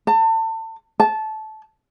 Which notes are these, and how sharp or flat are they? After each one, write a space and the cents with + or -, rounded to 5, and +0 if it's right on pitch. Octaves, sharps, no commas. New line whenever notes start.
A5 +30
A5 -15